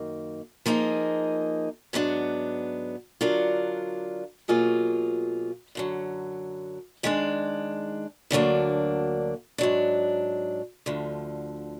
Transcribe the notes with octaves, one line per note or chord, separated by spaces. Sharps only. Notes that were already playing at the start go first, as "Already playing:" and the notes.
Already playing: F#2 D#3 A#3
F3 A#3 D#4 G#4
G#2 F#3 B3 D4
D3 F#3 D4 F4 A#4
B2 F#3 A#3 F4 G#4
F#2 D3 F#3
G#2 D#3 G#3 D4
D2 D3 F#3 A#3 D4
G#2 F#3 D4
D2 D3 F3